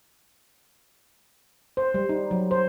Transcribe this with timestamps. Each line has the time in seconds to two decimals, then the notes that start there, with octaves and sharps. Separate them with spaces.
1.77 C5
1.94 G3
2.09 D#4
2.31 F#3
2.51 C5